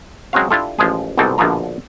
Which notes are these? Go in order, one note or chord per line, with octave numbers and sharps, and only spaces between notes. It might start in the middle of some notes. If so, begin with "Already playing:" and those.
F#3 G#3 C4 C#4 F#4 F5
D4 E4 F4 G4 A4
A1 F3 G#3 G#4
C2 G#2 B2 C4 A4 D5
A#1 B2 D3 F3 F4 A#5